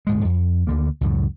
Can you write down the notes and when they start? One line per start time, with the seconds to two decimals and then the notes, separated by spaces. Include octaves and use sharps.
0.07 D1 G#2 G#3
0.25 F2
0.67 D2 D3 A#3
1.01 C#2 F#2 A2